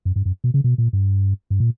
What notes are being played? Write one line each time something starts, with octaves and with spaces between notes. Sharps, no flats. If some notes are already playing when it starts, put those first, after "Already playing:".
F#2
G2
F#2
B2
C#3
B2
A#2
G2
G2
A#2